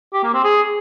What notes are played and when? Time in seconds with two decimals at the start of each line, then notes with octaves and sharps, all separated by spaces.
0.13 G4
0.23 A#3
0.34 C4
0.44 G#4